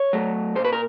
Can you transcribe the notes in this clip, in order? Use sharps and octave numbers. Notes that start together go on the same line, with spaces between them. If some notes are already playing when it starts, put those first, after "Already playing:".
Already playing: C#5
F#3 A3
A#2 C5
B4
A#4